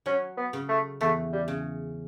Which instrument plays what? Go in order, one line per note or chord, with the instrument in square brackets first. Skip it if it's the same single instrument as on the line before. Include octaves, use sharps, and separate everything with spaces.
[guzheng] F#3 [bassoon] C#4
[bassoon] B3
[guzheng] C#3
[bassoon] A3
[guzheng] E2 [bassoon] A3
[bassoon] G3
[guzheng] C#3